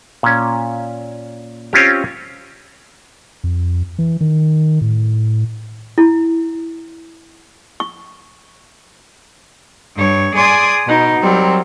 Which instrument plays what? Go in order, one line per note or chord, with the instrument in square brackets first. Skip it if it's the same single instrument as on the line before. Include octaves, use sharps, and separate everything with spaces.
[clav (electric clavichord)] A#2 C#4
C4 C#4 F4 G4
[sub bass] F2
E3
D#3
A2
[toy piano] E4
C#6
[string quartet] G2 C#5
G#4 D5 G#5 C6 D#6
B2 D#4
F#3 G3 C4 A#4